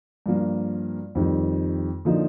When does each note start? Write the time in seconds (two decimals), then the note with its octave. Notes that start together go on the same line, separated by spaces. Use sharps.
0.26 G2 F3 A#3
1.15 F2 D#3 G3
2.05 D3 F3 A#3 D#4